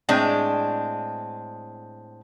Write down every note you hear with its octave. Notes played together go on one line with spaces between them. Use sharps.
A2 G#3 C4 D4